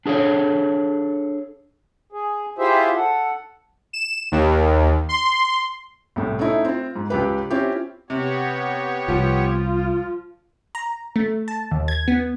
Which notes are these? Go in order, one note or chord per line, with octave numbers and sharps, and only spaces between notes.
D4 G#4 A4 C#5
G#4
E4 F4 G4 G#4 C5 E5
A4 F#5
E7
D#2
C6
C2 A2
A3 C#4 D#4 E4
C4 F4
G#2
C#2 G4 B4
C4 C#4 E4 F4 G4
C3 B3 G4 C#5
C2 F3 F4
A#5
A3
A5
D#2
G#6
B3